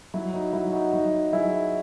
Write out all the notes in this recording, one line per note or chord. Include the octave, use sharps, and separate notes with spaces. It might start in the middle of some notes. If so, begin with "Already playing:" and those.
F#3 E4
D#4 F#4
F#3 E4
D#4 F#4
F#3 D#4 F#4
F#3 E4 G#4